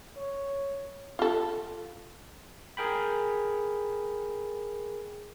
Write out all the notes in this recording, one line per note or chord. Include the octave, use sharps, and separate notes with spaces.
C#5
F4 A4
G#4 A#4 G5 B5